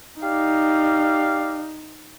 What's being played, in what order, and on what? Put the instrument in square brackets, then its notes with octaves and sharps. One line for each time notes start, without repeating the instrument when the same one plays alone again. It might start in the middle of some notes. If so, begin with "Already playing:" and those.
[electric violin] D#4 [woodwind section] G4 D5 F5